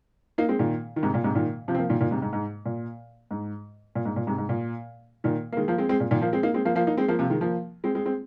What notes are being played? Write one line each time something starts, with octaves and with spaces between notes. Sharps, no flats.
A#3 D#4
G#3 C4
A#2 D#3
D#3
G#2 C3
A#2
G#2 C3
A#2 D#3
C3 F3
C4
F3 A#3
A#2 D#3
A#2 D#3
G#2 C3
G#2
G#2
A#2
G#2
A#2
G#2
A#2
G#2 C3
G#2
A#2
A#2 D#3
A#3
D#3 G#3
F3 A#3
G#3 C4
G#3 C4
A#2
A#2 D#3
F3 A#3
G#3 C4
A#3 D#4
G#3 C4
F3 A#3
F3 A#3
A#3 D#4
G#3 C4
F3 A#3
C3 F3
D#3 G#3
F3 A#3
G#3 C4
G#3 C4
G#3 C4